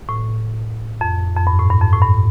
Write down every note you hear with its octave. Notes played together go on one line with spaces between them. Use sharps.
A2
F2
F2
G2
A2
G2
F2
A2
G2